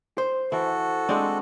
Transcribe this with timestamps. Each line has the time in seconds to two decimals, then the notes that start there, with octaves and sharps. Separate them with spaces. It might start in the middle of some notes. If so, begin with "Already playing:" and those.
0.18 C5
0.52 E3 F#4 A4
1.09 G#3 C4 D4